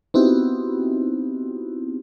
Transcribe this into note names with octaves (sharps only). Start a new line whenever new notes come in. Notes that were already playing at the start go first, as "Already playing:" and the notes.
B3 C4 D#4 E4 F#4 G4